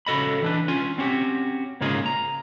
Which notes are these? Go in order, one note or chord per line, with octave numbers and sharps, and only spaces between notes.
C#3 F#4 A4 D#5 B5
E3 D4 B4
C#4 F4 G#5
C4 C#4 F#4 G4
G#2 C#3 A#3 F4 G#4 D#5
A#5